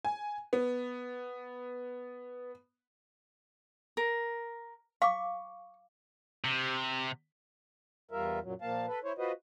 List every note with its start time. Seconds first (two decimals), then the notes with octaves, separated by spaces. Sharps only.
0.05 G#5
0.53 B3
3.97 A#4
5.02 F5 C#6 D6
6.44 C3
8.11 E2 G3 F4 A#4 E5
8.42 F#2 A#2 F#3
8.62 A#2 F3 A#3 F5 A5
8.87 A4 B4
9.04 E4 C5 C#5
9.18 F4 F#4 B4 C5 D#5